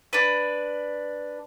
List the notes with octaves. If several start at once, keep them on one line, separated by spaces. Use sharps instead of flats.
D4 B4